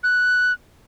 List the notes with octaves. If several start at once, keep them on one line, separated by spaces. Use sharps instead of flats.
F#6